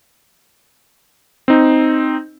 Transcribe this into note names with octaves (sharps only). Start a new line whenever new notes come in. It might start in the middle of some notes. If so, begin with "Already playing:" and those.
C4 D#4